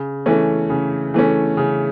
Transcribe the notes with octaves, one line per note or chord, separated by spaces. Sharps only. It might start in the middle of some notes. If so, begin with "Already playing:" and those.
Already playing: C#3
E3 A3 C#4
C#3
E3 A3 C#4
C#3